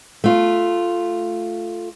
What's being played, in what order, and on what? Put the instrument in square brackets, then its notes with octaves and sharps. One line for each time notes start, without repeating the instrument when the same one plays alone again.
[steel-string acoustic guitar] A3 F4